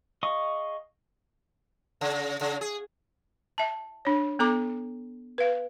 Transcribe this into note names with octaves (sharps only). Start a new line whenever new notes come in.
G#4 D#5 F5 C#6 D#6
C#3
C#3
G#4
E5 A5
D4 C#5
B3 A4 A#5 D6
B4 F5